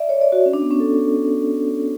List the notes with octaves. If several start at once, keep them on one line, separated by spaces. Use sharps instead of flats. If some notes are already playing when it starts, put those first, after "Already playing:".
Already playing: D5 E5
C#5
D5
F#4
C#4
D4
B3
C#4
A4